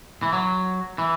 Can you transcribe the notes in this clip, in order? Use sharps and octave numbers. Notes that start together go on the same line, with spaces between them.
E3
F#3
E3